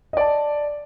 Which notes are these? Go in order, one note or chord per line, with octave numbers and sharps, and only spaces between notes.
D5 D#5 A5